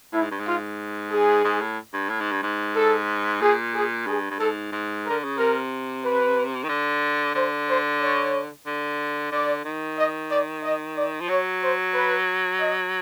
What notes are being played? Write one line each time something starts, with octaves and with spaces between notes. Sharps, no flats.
A2 E4
G#2
G2
G#2
F4
G#4
G#2
A2
G2
A2
G#2
G2
G#2
A4
A#2 G#4
G#4
G2 G#4
G2
G#2 A4
G#2
D3 A#4
C#3
C3 A#4
B4
D#3
D3
D3 C5
C5
C#5
D3
D3 D5
D#3
D#5
D5
D#5
D5
F3
F#3 C#5
C5
B4
D#5